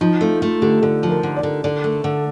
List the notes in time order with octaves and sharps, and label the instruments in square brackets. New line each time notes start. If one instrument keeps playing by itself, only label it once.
[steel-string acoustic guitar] F3 [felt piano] D#4
[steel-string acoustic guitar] A3 [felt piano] F4
[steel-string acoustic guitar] A3 [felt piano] F4
[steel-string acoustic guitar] D3 [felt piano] G4
[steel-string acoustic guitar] D3 [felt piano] A4
[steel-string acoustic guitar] F3
[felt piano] A#4
[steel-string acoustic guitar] D3
[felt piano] D5
[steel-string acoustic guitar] D3
[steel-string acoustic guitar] D3 [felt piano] D5
[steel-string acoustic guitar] A3
D3